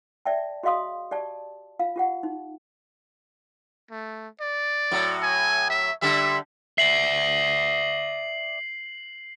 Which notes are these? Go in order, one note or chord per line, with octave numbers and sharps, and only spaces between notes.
D5 E5 G5 A5
F#4 G#4 D#5 F5 C6 D#6
G4 D5 A5
F4 F5
F4 G4 F#5
D#4
A3
D5
A2 F#3
G#5
E5
D3 G3 E5
D5 E5 C7 F#7